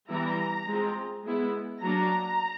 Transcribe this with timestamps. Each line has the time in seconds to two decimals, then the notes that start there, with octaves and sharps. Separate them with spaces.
0.08 E3 G3 B3 E4 A#5
0.66 G#3 C4 F4
1.24 G#3 B3 E4
1.82 F#3 A#3 D4 A#5